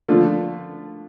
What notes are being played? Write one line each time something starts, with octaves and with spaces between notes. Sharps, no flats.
D3 F3 A3 D4 F4